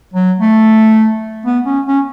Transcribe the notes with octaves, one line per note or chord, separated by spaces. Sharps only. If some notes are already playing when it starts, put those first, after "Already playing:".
F#3
A3
B3
C#4
C#4